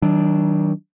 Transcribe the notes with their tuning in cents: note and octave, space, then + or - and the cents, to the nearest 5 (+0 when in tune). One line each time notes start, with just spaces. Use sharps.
D#3 +35 F#3 +40 D4 +0